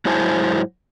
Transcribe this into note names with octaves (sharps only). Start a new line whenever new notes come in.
G#2 F#3 E4 C5 G#5 A5